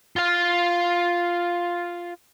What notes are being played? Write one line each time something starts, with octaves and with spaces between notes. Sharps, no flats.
F4 F5